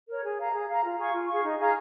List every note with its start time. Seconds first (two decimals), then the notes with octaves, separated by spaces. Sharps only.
0.08 A#4 C#5
0.24 G#4
0.38 F5 A#5
0.53 G#4
0.68 F5 A#5
0.83 F4
0.98 G#4 F5 C#6
1.13 F4
1.28 G#4 F5 C#6
1.43 D#4
1.58 G#4 F5 A#5